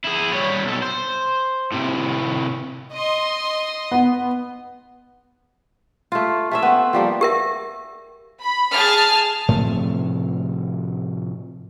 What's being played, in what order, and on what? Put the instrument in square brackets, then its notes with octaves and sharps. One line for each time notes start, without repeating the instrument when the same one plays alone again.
[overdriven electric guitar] E4 G#4
G3 C#5
B1 A4
C5
A2 C3
[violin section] D#5 C6
[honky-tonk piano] B3
[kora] A3 F4
A3 C#4 E5
B3 C4
F3 G3 A#3
[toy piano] G4 A#4 E5
[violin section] B5
G#4 A5 F6
[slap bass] A2 C3 F3 A3